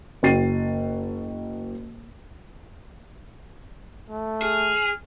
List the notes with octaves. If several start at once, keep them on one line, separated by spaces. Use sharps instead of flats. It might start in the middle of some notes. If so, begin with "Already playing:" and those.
F#1 F#4 G5 A6 C7 D#7
A3
G#4 F6